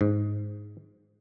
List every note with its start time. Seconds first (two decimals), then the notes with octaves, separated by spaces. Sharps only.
0.01 G#2